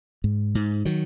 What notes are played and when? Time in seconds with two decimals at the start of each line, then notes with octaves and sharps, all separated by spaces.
0.24 G#2
0.55 G#2
0.85 D#3 F#3